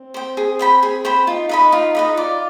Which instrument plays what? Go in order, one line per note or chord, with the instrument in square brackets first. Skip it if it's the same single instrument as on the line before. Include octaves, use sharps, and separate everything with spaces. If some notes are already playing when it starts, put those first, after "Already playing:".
Already playing: [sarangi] C4
[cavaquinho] C5 G5
G#4
C5 G5 B5
G#4
C5 G5 B5
[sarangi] D#4 [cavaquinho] F4
[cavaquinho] B4 D#5 B5
F4
B4 D#5 B5
[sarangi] F4 [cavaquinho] D5